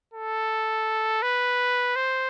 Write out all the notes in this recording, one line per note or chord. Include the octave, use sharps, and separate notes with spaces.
A4
B4
C5